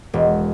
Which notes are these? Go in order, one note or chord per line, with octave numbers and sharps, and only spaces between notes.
E1